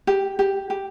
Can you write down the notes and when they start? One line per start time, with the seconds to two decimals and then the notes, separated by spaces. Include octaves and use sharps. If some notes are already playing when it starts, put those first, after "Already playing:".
0.07 G4
0.39 G4
0.70 G4